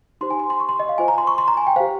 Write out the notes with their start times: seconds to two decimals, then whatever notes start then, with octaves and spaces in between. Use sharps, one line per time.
0.21 D#4 G4 C5 C6
0.30 G#5
0.39 C6
0.50 C6
0.60 C#6
0.69 C6
0.80 D#5
0.89 F5
0.98 F4 C5 G#5
1.08 A#5
1.18 C6
1.27 C#6
1.38 C6
1.48 A#5
1.57 G#5
1.67 G5
1.76 G4 C5 F5